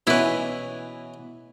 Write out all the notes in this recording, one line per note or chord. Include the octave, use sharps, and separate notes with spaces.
B2 E3 C#4 E4 B4